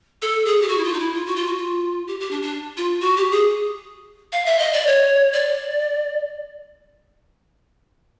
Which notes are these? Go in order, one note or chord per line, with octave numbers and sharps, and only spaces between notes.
A4
G#4
G4
F#4
E4
F4
D#4
E4
F4
F#4
F4
F#4
F4
G4
G4
D4
D4
F4
F#4
G4
G#4
F5
E5
D#5
D5
C#5
D5